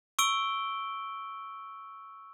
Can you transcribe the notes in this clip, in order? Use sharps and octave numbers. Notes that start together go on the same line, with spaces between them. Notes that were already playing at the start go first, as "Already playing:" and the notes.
C#6 E6 D7 G7